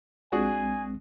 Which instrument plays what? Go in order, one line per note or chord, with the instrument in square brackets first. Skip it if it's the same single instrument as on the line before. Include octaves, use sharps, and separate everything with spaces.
[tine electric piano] A#1 G#3 C4 [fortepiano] D4 F#4 G#4 [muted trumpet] G#5